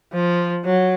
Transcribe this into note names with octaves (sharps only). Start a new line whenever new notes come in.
F3
F#3